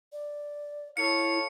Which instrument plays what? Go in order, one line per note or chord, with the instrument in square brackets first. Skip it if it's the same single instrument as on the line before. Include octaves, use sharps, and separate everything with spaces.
[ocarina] D5
[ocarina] E4 [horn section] A4 C#5 F5 [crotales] C#7